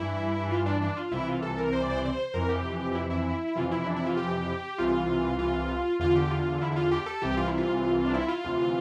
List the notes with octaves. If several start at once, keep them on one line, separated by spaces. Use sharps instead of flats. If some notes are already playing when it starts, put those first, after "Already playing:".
Already playing: G2 E3 E4
F4
D4
D4
F4
C2 C3 E3 E4
F4
A4
A#4
C5
D5
C5
D5
C5
F2 C3 E3 A#4
G4
E4
E4
F2 C3 E3 F4
E4
D4
E4
F4
G4
C2 C3 E3 F4
F4
E2 D3 F4
G4
F4
E4
E4
F4
G4
A4
C2 C3 E3 G4
F4
E4
F4
D4
E4
F4
D2 C3 E3